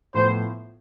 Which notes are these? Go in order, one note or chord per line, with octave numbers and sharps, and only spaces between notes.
A2 F3 B3 C5